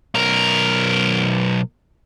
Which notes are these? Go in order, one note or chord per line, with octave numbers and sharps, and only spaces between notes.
B1 A#4